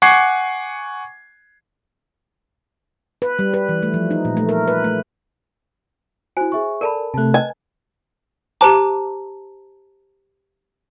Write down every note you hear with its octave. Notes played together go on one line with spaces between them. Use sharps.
F#5 G#5 C#6 D6 G#6 C7
B4
G3
B4
E3
A3
F3
D#4
A#2
A3
A#4
B4
A3
E4 F#4 C5 G#5
G#4 E5 C#6
A4 A#4 D5 A5 B5
C3 A3 A5 F#6
B4 D#5 G#5
G4 C5 A5 A#5 D6